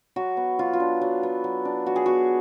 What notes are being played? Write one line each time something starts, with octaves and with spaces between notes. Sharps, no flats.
F#3 F#4
B3
F#3 F4
F4
D4
F#3
B3
F#3
D4
F#3 F#4
G#4
B3 F#4